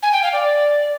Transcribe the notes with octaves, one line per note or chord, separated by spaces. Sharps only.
G#5
G5
F5
D5